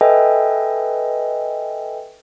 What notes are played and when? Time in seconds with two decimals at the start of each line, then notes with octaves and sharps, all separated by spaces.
0.01 A4 B4 D#5 E5 G5 G#5